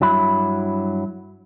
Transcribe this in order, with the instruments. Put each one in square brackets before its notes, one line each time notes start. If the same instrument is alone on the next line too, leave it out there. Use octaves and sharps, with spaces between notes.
[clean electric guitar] G2 F#3 E4 B5